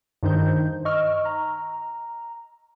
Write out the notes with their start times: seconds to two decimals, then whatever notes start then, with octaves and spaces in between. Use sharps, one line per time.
0.23 G2 D#3 D#4 C5 G6
0.85 D#5 C#6 E6 F6
1.25 A#5